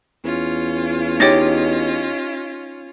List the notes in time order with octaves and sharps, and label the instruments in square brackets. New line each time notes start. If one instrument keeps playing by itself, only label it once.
[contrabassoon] E2 [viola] C#4 F4
[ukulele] D#4 G4 [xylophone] C#5 A6 A#6